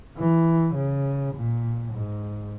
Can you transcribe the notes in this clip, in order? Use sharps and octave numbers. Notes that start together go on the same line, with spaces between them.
E3
C#3
A#2
G#2